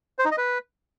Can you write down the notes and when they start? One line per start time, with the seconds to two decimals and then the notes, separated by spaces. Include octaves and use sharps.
0.19 C5
0.25 D#4
0.31 D#5
0.38 B4